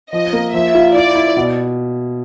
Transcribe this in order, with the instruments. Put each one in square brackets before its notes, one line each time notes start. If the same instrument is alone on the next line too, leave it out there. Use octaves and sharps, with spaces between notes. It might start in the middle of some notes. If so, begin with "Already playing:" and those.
[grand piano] F3 [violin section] D#5
[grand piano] A#3
[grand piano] F3 [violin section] E5
[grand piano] F4
[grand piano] E4 [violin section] D5
[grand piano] E4
B2